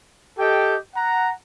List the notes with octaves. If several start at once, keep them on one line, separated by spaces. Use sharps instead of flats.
G4 A4 D#5 G5
F#5 A#5